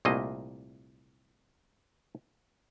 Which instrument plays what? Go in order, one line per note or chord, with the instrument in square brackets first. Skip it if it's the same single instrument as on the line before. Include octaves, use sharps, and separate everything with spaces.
[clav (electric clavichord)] C2 A#2 A3 A#3 D#5